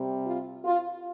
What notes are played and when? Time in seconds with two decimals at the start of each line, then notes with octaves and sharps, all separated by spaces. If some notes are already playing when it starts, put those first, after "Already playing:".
Already playing: C3 G3
0.26 F4
0.65 F4